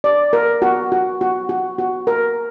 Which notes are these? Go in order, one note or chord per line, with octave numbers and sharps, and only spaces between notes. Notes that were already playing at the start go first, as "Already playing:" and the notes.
D5
A#4
F#4
F#4
F#4
F#4
F#4
A#4